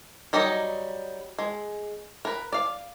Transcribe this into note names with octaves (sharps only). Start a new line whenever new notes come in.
F#3 G3 D#4 D5 D#5
G#3
A#4 B4
D5 F5